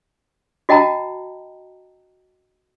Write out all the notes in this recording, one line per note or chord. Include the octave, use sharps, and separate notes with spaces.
F#4 D#5 G5 A5 A#5